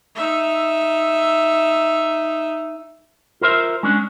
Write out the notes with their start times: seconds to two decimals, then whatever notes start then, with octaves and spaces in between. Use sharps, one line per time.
0.16 D#4 E5
3.41 F4 A#4 C5 E5
3.83 G#3 C#4 D4